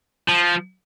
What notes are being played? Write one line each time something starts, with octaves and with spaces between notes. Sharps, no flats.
F3